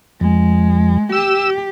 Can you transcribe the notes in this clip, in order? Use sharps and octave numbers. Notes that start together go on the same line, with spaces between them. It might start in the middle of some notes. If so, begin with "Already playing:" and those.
F2 G#3
G4 E6